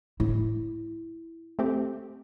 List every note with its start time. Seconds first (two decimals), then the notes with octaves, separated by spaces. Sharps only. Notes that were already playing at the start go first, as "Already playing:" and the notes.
0.20 A2 E4
1.59 A3 C4 G4